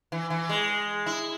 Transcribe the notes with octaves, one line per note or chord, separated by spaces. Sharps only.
E3
E3
G#3
E4